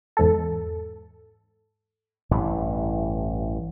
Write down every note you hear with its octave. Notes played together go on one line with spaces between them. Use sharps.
E2 G#2 A4
A1 G2 E3